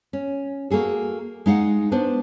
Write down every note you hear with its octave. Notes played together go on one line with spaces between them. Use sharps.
C#4
A#3 F#4 G#4 A4
G#3 D#4 F5 F#5
B3 D4 C5